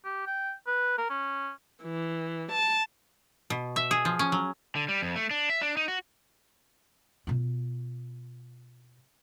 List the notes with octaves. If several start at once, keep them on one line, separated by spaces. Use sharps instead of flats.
G4
G5
B4
A#4
C#4
E3
A5
B2
E5
G#4
F3
C#4
F#3
D3
G3
F2
A3
D4
E5
D4
D#4
F#4
B2 F4